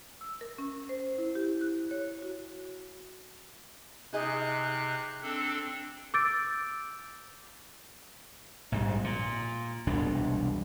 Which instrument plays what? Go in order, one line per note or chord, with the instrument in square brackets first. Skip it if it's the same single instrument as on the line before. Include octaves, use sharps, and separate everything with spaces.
[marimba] E6
A#4
C#4
C5
E4
G4
F#6
C#5
F#4
[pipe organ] C3 F#6 [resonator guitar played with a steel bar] D#4 G#4 D#5
[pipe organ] C4 D4 A4
[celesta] D6 E6 G6 A6 D7
[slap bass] A#1 G#2 G3
A#2
E1 C2 B2 D4